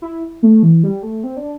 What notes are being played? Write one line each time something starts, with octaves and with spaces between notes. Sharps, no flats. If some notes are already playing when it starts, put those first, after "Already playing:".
E4
A3
E3
G3
A3
C4
D4